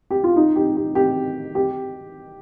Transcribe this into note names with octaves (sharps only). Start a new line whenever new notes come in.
G4
F4
D#4
G4
G4
G4
G4